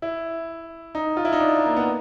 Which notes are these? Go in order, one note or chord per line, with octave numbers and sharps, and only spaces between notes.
E4
D#4
F4
E4
D#4
D4
A#3
B3